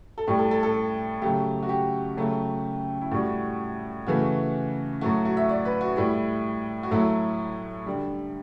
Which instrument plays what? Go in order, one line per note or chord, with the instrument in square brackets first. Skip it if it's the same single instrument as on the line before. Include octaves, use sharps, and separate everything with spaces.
[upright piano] A4
A2 G3 G4
A4
A4
A4
C#3 F#3 A3 G4
F#4
G4
C#3 F#3 A3
E4
A2 G3 F#4
C#3 E3 A3 F#4
A2 F#3 A3 F#4
F#4
E5
D5
B4
F#4
A2 G3 E4
F#4
A2 F#3 A3 E4
D3 G3